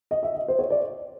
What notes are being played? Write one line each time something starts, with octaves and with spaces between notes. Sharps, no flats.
D#5
E5
D#5
C5
C#5
D5